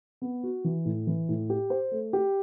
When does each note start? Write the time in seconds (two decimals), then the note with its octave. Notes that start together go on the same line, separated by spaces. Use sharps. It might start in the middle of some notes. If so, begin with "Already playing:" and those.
0.22 B3
0.43 F#4
0.64 E3
0.85 A2
1.07 E3
1.29 A2
1.50 G4
1.70 C5
1.91 A3
2.13 G4